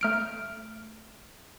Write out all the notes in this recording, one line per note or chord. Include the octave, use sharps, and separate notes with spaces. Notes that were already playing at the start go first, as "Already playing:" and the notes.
A3 F6 D7